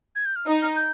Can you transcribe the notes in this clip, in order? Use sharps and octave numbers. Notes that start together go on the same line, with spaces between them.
G#6
G6
F6
D#4 D#6
F6
G6